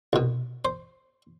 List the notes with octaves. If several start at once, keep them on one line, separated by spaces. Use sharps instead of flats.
C2 B2
C5